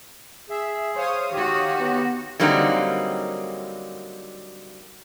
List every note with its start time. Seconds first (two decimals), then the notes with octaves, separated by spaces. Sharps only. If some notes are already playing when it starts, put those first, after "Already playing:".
0.49 G#4 E5
0.96 C5 C#5 F5 D#6
1.33 D#3 F#4 G4
1.79 B3
2.40 D3 F#3 G3 A#3 C4 D#4